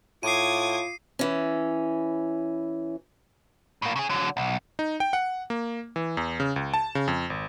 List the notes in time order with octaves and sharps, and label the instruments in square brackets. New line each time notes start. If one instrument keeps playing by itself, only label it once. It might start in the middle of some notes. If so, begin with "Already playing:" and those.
[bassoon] A2 [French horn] F4 [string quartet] D6 D#6 G#6 [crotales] C7 D#7
[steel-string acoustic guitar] E3 C#4
[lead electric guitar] A2 A#3
C#3 G#4
D3 F#3
B1
[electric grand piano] D#4
G5
F#5
A#3
E3
E2
C#3
C#2
A5
C#3
F2
G#1